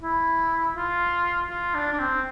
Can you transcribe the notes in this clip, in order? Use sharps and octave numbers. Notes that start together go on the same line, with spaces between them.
E4
F4
F4
D4
D4
C4